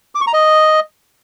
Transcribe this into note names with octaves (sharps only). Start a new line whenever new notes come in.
D6
C#6
A#5
D#5